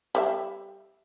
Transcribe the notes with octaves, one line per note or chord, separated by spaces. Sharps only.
G3 C#5 E5